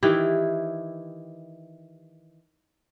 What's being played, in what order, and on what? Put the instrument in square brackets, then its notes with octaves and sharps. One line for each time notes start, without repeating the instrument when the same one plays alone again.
[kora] D#3 E3 E4 G4